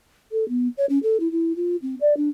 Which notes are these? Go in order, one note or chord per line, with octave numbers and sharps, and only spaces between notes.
A4
B3
C#5
C#4
A4
E4
E4
F4
C4
D5
D4